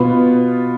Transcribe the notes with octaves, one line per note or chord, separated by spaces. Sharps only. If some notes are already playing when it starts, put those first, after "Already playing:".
Already playing: B2 B3 F4 B4